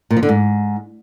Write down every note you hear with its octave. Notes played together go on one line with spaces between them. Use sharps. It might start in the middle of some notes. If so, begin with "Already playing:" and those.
A#2
F3
D3
G#2